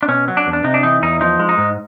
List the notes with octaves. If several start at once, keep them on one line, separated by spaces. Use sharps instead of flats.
D4
B2 C#4
F#3
D4
E2
D4
C3 D#4
D4
E3 D#4
E2 D#4
F3 D#4
G#3
D#4
G#2